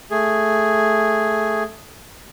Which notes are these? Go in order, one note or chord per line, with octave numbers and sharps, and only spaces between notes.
A3 G#4